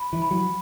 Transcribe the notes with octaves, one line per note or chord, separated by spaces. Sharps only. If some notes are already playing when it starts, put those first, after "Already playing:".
Already playing: B5
E3
B5
F#3